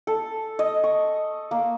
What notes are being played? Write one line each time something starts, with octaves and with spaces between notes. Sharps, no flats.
A4
D#5
C#6
A#3